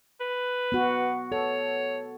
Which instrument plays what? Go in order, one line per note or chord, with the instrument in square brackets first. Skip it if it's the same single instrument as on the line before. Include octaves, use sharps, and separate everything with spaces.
[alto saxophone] B4
[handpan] B3 F#4
[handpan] A4 [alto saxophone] C#5